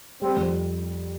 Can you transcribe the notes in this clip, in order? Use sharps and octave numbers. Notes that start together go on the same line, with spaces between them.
G3 C4
F2